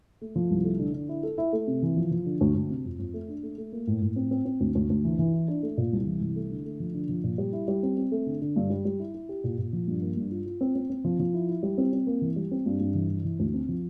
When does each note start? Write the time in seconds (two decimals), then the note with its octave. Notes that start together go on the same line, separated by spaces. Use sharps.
0.21 A3
0.36 F3
0.51 C2
0.64 A3
0.79 D3
0.94 D3
1.09 E4
1.23 A4
1.38 E4
1.53 A3
1.67 C3
1.82 E3
1.97 F3
2.11 F3
2.26 D3
2.41 D2
2.55 D2
2.70 C3
2.85 F2
2.99 F2
3.14 A3
3.28 D4
3.43 A3
3.58 A3
3.72 A#3
3.87 A2
4.01 A2
4.16 C4
4.31 C4
4.45 C4
4.60 D2
4.75 D2
4.90 D2
5.04 E3
5.19 E3
5.33 E4
5.48 D4
5.63 A3
5.77 A#2
5.93 C2
6.07 E3
6.21 C2
6.36 A3
6.51 D3
6.65 A3
6.80 F3
6.94 D3
7.09 F3
7.24 A#2
7.38 G3
7.53 E4
7.68 G3
7.83 C4
7.97 C4
8.12 A3
8.26 D3
8.41 D3
8.56 G2
8.70 G3
8.85 G3
8.99 E4
9.14 E4
9.29 G4
9.44 A#2
9.58 A#2
9.73 F3
9.87 G2
10.02 A#3
10.17 G2
10.31 F4
10.46 F4
10.61 C4
10.75 C4
10.90 C4
11.05 F3
11.20 F3
11.34 E4
11.49 E4
11.63 G3
11.78 C4
11.93 C4
12.07 A#3
12.21 E3
12.36 G3
12.51 C4
12.66 G2
12.80 G2
12.95 E3
13.10 E3
13.24 E3
13.39 D2
13.54 C4
13.69 F3